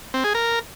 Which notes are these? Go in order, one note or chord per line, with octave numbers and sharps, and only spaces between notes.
C4
G#4
A#4